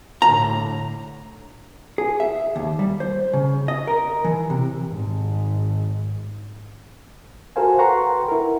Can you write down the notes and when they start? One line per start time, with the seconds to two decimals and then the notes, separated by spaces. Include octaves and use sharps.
0.22 A2 D3 A#5
1.98 G#4
2.20 E5
2.56 D#2
2.79 G3
3.00 C5
3.33 C#3
3.68 D#5
3.87 A#4
4.24 E3
4.50 C3
4.87 G#1 G#2
7.56 F#4 A4 A#4 C5 F5 G#5
7.78 B4 F#5 G5 A#5 C6 C#6
8.28 E4 A#4